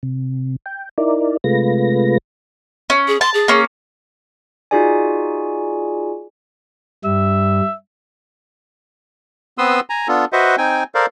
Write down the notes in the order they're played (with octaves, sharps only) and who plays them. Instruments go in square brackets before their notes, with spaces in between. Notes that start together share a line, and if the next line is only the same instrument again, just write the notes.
[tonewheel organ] C3
G5
D#4 E4 A#4 D5
C3 G#3 A3 F4 B4 A#6
[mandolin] C#4
[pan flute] G#4
[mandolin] A5 [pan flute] C6
[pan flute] G#4
[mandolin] A#3 C#4
[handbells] D#4 F4 F#4 G#4 D5 G#5
[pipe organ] G2 G3 [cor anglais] E5
[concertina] B3 C4 B4 C6 D#6 E6
G#5 A#5
B3 D4 F4 A4
F#4 B4 C5 D#5 E5 F#5
C4 D#4 G5 G#5
A4 A#4 C5 D5 F5